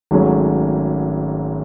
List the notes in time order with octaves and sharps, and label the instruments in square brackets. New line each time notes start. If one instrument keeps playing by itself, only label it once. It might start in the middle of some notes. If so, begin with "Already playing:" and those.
[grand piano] G#1 G#2 F#3 A3 C#4